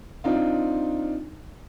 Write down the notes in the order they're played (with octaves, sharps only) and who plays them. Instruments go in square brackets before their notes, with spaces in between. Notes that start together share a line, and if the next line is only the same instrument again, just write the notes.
[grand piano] C4 D4 D#4 F4